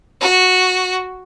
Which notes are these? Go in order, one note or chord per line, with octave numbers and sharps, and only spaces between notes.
F#4